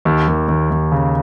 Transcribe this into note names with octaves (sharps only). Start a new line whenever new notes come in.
D#2
D#2
D#2
D#2
C#3